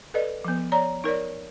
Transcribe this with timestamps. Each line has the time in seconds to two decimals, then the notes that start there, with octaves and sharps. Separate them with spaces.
0.14 A4 B4 D5 D#5
0.44 F3 B3
0.72 C#5 D5 A#5
1.04 D#4 A#4 C#5 D5